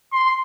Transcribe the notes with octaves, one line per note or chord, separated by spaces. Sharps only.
C6